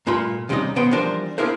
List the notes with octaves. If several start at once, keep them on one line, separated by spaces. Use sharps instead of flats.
G2 A#2 A3 F4 B5
D#2 C3 G3 C#4 D#4 D#5
B2 D#3 B3 C5 G5
E3 F3 G3 D4 A#4 C5
A#3 D4 E4 G#4 A#4 C5